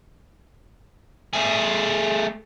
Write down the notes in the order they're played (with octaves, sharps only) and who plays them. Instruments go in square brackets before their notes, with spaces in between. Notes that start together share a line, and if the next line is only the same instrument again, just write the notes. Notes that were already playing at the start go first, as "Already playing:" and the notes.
[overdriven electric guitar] A3 G#4